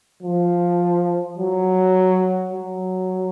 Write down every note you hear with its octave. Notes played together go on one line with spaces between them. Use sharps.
F3
F#3
F#3